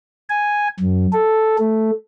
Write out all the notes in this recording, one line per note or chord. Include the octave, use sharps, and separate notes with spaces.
G#5
F#2
A4
A3